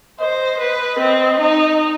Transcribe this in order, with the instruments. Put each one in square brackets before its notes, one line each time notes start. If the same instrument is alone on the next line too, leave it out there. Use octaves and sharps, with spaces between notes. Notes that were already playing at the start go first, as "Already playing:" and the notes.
[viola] C5 [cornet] D#5
[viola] B4
[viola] C4 [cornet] D#5
[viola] D#4